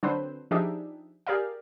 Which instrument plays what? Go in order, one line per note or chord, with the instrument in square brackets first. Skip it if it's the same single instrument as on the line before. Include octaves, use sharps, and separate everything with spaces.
[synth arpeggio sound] D3 F#3 C4 D4 B4 C5
F3 D4 D#4 G4 G#4 E5
G4 G#4 A#4 D5 F5